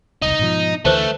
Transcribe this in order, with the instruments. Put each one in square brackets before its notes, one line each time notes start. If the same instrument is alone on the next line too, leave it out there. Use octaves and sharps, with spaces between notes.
[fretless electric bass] E1 C2 [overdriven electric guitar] D#4
[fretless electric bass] G#2 B2 F3
[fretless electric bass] D2 D3 E3 [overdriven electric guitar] A3 [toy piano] B4 C5 A5